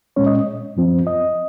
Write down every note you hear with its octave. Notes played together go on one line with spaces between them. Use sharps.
A#2 G#3 C#4 C#5
D#5
F#2 F3 C4
D#5